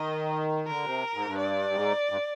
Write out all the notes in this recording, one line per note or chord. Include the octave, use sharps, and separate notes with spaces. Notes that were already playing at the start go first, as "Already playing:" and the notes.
Already playing: D#3 D#5
D3 A#4
C3
G#2
G2
D5
G#2
G2